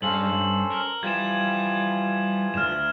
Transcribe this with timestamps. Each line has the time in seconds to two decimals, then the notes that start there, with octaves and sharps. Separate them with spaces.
0.02 G2 C#4 A4 C5 F5 F#7
0.31 G2
0.72 A#4
1.03 E3 F3 G3 F4 G#6 E7
2.54 D2 G2 F6 E7